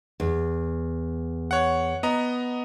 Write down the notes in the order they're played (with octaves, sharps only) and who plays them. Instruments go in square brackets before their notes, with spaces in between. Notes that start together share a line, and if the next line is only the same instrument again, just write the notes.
[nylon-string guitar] E2
[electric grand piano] C#5 F#5
B3 D#5 A#5